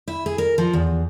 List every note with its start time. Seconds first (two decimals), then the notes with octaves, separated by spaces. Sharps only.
0.08 E4
0.26 G#4
0.38 A#4
0.58 F3
0.73 E2